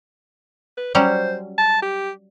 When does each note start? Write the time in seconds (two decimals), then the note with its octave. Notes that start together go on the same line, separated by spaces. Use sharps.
0.78 B4
0.95 F#3 G3 C#4 C5
1.58 A5
1.82 G4